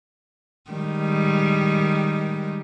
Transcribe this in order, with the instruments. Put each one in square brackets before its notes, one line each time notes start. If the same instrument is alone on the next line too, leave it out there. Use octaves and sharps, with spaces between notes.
[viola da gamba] D#3 G3 G#3